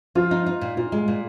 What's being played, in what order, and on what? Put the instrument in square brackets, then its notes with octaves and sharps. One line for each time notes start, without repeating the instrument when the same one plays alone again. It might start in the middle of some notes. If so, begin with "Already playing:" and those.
[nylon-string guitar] F3 [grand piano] F4
[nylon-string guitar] D#4
D#4
A#2
[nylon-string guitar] A#2 [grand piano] F4
[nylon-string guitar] G#3
A#2